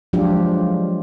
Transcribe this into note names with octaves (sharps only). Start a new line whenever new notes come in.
F3 F#3 G#3 D4 F4 G4